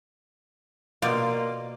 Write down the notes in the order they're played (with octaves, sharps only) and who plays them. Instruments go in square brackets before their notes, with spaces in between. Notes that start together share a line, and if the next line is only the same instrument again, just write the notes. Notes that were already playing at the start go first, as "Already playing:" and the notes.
[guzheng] B2 D5 F5 [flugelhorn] A#3 [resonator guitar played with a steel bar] F4